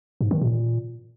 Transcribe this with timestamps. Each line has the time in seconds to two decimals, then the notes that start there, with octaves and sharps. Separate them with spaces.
0.21 G#2
0.31 D#3
0.41 A#2